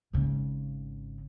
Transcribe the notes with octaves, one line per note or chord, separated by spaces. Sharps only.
G#1 C#3